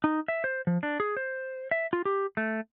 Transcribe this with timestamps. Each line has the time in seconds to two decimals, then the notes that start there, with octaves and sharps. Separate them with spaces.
0.04 D#4
0.28 E5
0.44 C5
0.67 F3
0.83 D4
1.00 G#4
1.17 C5
1.71 E5
1.93 F4
2.05 G4
2.37 A3